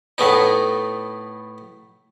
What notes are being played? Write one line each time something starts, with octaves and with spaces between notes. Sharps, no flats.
A2 A3 B3 D#4